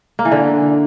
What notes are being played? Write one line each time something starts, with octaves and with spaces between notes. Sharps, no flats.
A#3
E3
D3